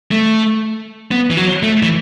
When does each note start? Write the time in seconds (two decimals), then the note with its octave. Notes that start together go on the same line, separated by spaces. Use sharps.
0.11 A3
1.11 B3
1.30 E3
1.37 F#3
1.63 A3
1.83 E3